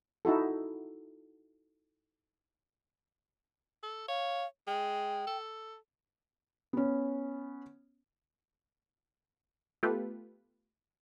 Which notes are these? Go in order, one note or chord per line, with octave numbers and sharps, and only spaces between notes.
D#4 E4 F#4 A4
A4
C#5 F5
G#3 G5
A4
B3 C#4
A3 B3 F4 G4 A4 B4